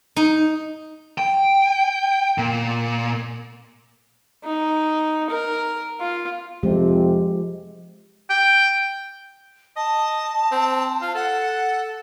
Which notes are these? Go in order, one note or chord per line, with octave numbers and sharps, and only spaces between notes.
D#4
G5
A#2
D#4
A#4
F4
F2 C3 F3 G#3 C4 G4
G5
D#5 A5
C4
F4
A4 F#5